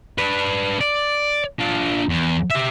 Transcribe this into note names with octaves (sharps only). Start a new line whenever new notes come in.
D4 B4
D5
D4 F4
E2
G4 E5